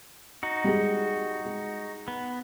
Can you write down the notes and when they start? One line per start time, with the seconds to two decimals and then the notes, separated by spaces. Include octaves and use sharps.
0.43 D#4 F#4
0.64 G3 G#3
1.45 G#3
2.08 B3